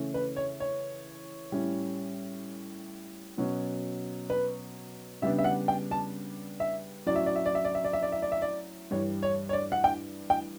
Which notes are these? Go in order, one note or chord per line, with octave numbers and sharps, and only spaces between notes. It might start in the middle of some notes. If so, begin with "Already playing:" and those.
Already playing: C#3 E3 A3 C#4
B4
C#5
C#5
A2 G3 C#4
B2 F#3 C#4
B4
C#3 G3 B3 D4 E5
E5
F#5
G5
A5
E5
A2 F#3 C#4 D5
E5
D5
E5
D5
E5
D5
E5
D5
E5
D5
E5
D5
E5
D5
G2 E3 G3 D4 C#5
C#5
C#5
D5
F#5
G5
G5